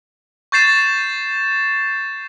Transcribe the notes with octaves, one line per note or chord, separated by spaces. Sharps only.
C#6 G6 A6 C7 E7